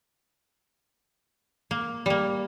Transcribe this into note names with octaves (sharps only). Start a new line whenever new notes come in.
A#3
G3 A#3